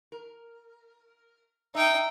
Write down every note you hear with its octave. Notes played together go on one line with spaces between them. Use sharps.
A#4
D#4 E5 G5